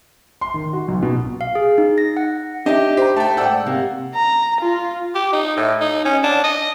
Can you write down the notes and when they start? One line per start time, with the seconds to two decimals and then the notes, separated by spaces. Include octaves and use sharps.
0.41 C6
0.54 D#3
0.73 F#4
0.88 B1
1.02 B2
1.41 F5
1.55 G#4
1.78 D#4
1.98 A#6
2.17 F#5
2.66 D4 D#4 G4 D#5 E5
2.97 G4 C5 A#5
3.17 A3 G5 A5
3.37 G#2 D5 F#5 G5 E6
3.67 C3 A#3
4.15 A#5
4.61 F4
5.15 G4
5.33 D#4
5.57 A2
5.81 D#4
6.05 C#4
6.23 D4
6.44 D#5